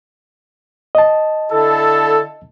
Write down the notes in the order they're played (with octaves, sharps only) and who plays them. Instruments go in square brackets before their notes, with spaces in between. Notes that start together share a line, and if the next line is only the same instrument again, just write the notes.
[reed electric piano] D#5 A5
[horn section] D3 E4 A4